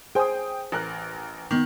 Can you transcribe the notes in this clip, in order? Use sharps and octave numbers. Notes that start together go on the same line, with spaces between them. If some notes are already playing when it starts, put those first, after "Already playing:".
G#4 C5 G5 D#6
A1 A#4 F#6
D#3 B3